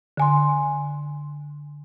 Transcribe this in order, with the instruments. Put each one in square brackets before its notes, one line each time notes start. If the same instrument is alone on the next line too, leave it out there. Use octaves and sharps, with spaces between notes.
[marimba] D3 G#5 C6